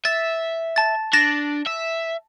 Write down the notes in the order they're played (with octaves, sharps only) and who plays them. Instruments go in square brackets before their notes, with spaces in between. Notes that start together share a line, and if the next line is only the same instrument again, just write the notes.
[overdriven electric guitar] E5 [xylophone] A6
[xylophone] A5 A6
[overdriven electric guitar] D4 [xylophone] A6 A#6 E7
[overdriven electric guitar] E5